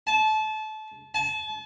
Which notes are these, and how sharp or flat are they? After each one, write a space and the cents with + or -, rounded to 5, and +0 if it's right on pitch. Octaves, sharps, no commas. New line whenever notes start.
A5 -25
A5 -35